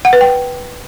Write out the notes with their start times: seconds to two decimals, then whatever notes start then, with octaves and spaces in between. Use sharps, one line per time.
0.05 F#5
0.13 B4
0.21 G5